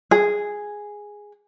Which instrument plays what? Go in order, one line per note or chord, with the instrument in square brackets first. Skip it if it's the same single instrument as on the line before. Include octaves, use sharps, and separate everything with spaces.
[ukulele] G#4